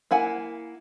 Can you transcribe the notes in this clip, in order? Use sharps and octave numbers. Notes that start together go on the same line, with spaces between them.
A#3 E4 F#5 G#5